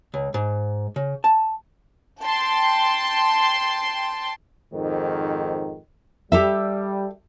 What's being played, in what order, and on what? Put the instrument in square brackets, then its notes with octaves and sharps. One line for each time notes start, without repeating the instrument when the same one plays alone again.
[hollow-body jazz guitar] C#2
G#2
C#3
A5
[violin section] G5 A5 C6
[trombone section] F2 G#2 D#3
[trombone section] G3 [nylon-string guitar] G4 A4 E5